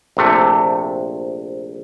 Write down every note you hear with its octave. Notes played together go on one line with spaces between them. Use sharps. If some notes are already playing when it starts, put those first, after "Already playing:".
A#1 C3 A3